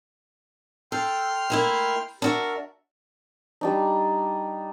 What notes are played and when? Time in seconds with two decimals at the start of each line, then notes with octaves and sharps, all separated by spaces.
0.92 A4 G5 C6 F6
1.50 A3 A#3 E4
2.22 D4 F#4 A#4 E5
3.61 G3 D4 D#4